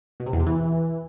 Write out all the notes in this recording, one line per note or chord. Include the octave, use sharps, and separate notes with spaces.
B2
C3
E2
C3
E3